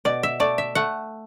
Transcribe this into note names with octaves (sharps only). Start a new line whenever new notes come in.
B2 D5
E5
A3 D5
E5
A3 F#5